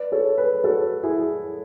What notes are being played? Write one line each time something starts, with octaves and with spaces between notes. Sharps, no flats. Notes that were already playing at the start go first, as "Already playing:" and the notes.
Already playing: B4 D5
A4 C#5
G#4 B4
F#4 A4
E4 G#4